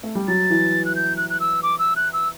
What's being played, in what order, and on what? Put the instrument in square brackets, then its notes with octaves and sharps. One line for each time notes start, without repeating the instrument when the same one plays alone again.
[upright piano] A3
G3
[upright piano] F#3 [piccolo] A6
[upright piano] E3
[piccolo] F#6
G6
F#6
F#6
E6
D6
E6
F#6
E6